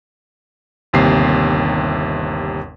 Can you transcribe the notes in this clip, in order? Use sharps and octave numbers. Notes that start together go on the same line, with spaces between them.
G1 D#2 C3 C7